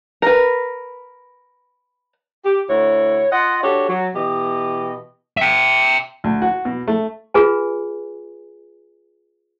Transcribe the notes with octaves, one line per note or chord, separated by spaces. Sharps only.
A#4 B4
G4
D2 E4 F#4 C#5
F4 D#5 F#5
D4 F#4 G4 A4 C#5
F#3
B2 E3 G4 D#5
E5 G5
D2
F#4
B2
A3
F4 G#4 B4 G#5